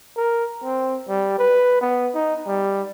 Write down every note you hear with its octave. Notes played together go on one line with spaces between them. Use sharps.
A#4
C4
G3
B4
B3
D#4
G3